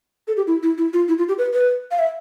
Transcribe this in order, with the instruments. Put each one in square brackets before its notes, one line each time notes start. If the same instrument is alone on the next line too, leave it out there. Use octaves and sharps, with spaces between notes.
[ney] A4
G4
E4
E4
E4
F4
E4
F4
G4
B4
B4
F5
E5